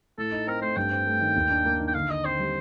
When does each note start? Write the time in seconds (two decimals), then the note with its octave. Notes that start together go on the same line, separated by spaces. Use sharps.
0.18 A2 A4
0.32 D#4
0.47 C4 A#4
0.61 A3 C5
0.76 G2 G5
0.91 C4
1.06 A3
1.21 D#3
1.36 D#2
1.50 D4
1.65 A#3
1.80 D#3
1.88 G5
1.94 D3 F5
2.09 D#4 D#5
2.24 C4 C5
2.39 G3